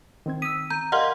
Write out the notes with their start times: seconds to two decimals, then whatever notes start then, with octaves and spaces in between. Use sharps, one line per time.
0.26 D#3 C4 G#6
0.42 D#6 E6 B6 D#7
0.70 A#5 G6 D#7
0.92 G4 A#4 D5 D#5 F5 F#5 C6 F6